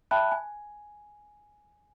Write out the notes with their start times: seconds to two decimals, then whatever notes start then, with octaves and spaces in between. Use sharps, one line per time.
0.11 E5 G5 A5 B5 F#6
0.32 G#5